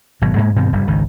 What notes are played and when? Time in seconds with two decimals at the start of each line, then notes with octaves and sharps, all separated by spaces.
0.21 G#1 B2 F#3
0.36 G#2 G#3 A#3
0.56 G2 B2 D#3 C4
0.73 F1 G2 G3
0.88 G#1 C#2 D#3